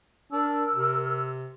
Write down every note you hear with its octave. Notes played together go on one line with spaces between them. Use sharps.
D4 A#4 E6
C3